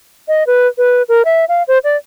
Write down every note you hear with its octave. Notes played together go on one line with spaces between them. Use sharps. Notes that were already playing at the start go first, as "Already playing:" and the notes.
D#5
B4
B4
A#4
E5
F5
C5
D5